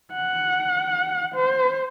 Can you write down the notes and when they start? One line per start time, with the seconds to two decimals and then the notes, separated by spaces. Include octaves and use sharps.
0.13 F#5
1.34 C5